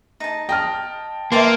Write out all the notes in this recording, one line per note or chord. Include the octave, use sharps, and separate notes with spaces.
D#4 A5
D#5 G5 A5 F6
A#3 B4 E5 G5 A5 C6